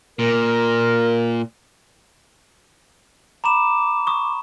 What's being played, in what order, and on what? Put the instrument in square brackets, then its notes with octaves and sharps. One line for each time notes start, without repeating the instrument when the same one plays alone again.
[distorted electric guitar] A#2 [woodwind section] A#4
[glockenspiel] A#5 B5 E7 [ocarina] D6
[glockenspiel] C#6 D#6